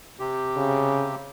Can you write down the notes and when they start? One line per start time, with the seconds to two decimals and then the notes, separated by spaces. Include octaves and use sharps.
0.19 C3 G4
0.57 C#3